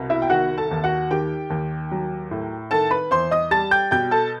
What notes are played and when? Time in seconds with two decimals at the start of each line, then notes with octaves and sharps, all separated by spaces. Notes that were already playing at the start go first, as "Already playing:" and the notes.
Already playing: C2 B2
0.10 E4 E5
0.22 G5
0.30 D#3 F#4 F#5
0.58 A4 A5
0.71 D#2
0.84 F#4 F#5
1.11 D#3 G4 G5
1.50 D#2
1.91 F#3
2.31 A2
2.71 D#3 A4 A5
2.91 B4 B5
3.11 E2 C5 C6
3.31 D#5 D#6
3.51 G3 A5 A6
3.71 G5 G6
3.91 B2 G5 G6
4.11 A4 A5